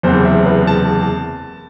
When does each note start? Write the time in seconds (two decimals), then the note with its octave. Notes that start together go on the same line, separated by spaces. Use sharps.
0.03 F#1 E2 C3 C5
0.25 E5
0.46 B4
0.67 A5